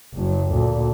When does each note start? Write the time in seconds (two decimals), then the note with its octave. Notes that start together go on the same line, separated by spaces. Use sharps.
0.14 F#1 F#2
0.50 D2 A#2